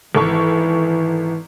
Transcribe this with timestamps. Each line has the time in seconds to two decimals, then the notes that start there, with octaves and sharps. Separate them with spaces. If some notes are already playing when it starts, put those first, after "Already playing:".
0.15 G#1 E3 A4 C#6